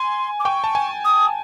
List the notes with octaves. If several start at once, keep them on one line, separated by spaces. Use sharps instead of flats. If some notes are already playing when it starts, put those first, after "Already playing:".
Already playing: G#5 C6
D6
G5 C#6
A5
G#5
D#6